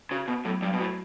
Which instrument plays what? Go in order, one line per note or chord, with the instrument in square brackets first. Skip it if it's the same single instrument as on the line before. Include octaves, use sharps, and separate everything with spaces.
[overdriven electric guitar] C#3 [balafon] F#4
[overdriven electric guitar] B2 [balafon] B3
[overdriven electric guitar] A2 [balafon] F#3
[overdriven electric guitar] G2 [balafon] F#3
[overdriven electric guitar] B2
[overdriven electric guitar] A2 [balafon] F#4